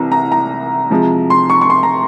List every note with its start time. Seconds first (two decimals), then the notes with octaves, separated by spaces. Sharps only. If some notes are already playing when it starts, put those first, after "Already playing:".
Already playing: C2 C3 E3 A#5
0.12 A#5
0.32 A#5
0.90 C3 F3 G#3
1.30 C6
1.50 C#6
1.61 C#6
1.70 C6
1.83 A#5